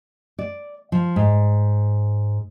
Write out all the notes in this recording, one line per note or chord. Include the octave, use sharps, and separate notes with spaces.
D5
F3
G#2